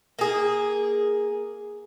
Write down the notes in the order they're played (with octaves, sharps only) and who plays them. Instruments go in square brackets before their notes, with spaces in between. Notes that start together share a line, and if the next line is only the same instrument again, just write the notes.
[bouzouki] A#3 G#4